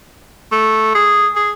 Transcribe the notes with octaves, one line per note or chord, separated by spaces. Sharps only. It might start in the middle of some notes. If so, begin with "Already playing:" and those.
A3
G#4
G#4